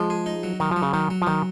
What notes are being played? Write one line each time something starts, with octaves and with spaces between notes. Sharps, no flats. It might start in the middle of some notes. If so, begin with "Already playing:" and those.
Already playing: F3 G#3
G#4
D#4
F#3
D#3 F#3
F3 F#3
C#3
D#3 F#3
F#3
F3
D#3 F#3